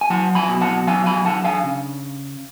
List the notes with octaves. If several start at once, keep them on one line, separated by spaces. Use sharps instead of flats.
G#5
F#3 F#5 A5
G#5 B5
B2
F#5 A5
F#3 F5 G#5
G#5 B5
D4 F#5 A5
F5 G#5
C#3